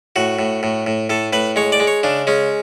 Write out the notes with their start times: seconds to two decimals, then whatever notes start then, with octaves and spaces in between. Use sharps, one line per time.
0.16 A2 F#4
0.39 A2
0.63 A2
0.87 A2
1.10 A2 A4
1.33 A2 B4
1.56 G#3 C#5
1.72 D5
1.80 G#3
1.87 C#5
2.03 C#3 D4
2.27 G#3 C#4